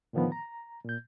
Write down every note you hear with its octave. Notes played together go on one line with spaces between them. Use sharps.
A2 D3 D#3 F3 A3 B3
A#5
A#2 G6